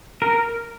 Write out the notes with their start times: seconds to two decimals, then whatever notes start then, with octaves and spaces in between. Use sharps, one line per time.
0.22 A#4